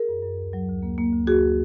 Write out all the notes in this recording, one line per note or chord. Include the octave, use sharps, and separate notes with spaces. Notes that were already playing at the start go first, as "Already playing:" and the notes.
Already playing: G#4 A#4
F#2
F#2
D2
F#3
D2
A#3
A#3
D2
D2 F#4 G#4